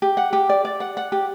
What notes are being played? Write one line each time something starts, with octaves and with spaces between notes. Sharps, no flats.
G4
F#5
G4
D5
D5
F#5
F#5
G4